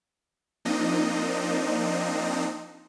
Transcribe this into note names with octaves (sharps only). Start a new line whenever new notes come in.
F3 A#3 C4 D4 D#4 D#5